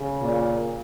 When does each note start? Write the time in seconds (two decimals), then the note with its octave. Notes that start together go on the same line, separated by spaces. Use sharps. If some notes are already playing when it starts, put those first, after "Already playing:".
Already playing: C#3
0.21 A#2